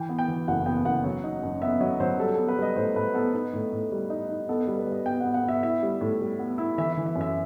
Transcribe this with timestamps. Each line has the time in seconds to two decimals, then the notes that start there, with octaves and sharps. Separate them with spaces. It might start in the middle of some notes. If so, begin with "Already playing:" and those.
Already playing: E3 G5
0.09 B3
0.19 G5
0.28 E3
0.48 F#1 F#5
0.66 B3 G5
0.85 F#1 F#5
1.04 F#3
1.24 D#4
1.43 F#2
1.62 B3 E5
1.81 F#3 D#5
2.00 F#3 C5
2.19 G3 A4
2.33 B3 A4
2.48 B4
2.57 G3
2.62 D#5
2.76 A2 C5
2.95 A2 B4
3.14 B3 A4
3.34 D#4 B4
3.53 A2
3.72 A2
3.92 G3
4.10 D#4
4.29 D#4
4.49 B3 A4
4.63 G3 B4
4.78 B4
4.87 G3
4.92 D#5
5.06 B3 G5
5.20 B3 F#5
5.34 F#5
5.43 B3
5.48 E5
5.63 E4 E5
5.83 G3
6.01 A2
6.21 G3
6.39 B3
6.58 E4
6.78 E3 E5
6.93 E3 E5
7.06 E5
7.15 F#2
7.21 E5